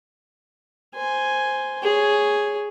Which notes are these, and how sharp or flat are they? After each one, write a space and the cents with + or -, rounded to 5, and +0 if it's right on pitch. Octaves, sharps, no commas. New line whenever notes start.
C5 +0 G#5 +0
G#4 +0 C#5 +0